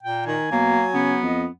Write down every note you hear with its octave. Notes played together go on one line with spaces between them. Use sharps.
A#2 G5
D#3 G#5
B2 F#3 A#3
C#3 B3
F2 D#5